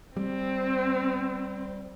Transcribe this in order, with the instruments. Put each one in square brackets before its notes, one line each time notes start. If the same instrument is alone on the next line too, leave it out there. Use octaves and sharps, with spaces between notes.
[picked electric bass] G3 [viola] C4